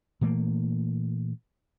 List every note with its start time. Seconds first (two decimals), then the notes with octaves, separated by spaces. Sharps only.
0.21 A#2 E3 A3 A#3